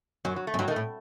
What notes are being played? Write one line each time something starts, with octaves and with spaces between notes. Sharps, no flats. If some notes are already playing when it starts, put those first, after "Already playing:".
F#2 F#3
F#3
A3
F#2
G2 F#3
D#3
A3
A2